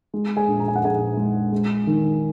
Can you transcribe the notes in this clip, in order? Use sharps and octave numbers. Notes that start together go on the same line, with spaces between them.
G#3
G#4 G#5
A#1
A#5
G#5
F#5
A#1 G#4 G#5
G#3
G#3
D#3